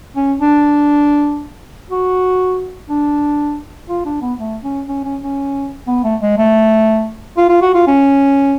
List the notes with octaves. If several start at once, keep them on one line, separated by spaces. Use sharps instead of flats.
C#4
D4
F#4
D4
F4
D4
B3
A3
C#4
C#4
C#4
C#4
B3
A3
G#3
A3
F4
F4
F#4
F4
C#4